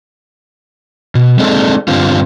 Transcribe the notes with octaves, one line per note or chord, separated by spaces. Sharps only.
B2
G#3 C4 D4 D#4 G#4 A4
G2 D3 C4 F4